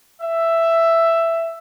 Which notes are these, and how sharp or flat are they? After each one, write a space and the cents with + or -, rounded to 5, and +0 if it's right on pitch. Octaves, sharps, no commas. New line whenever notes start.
E5 +10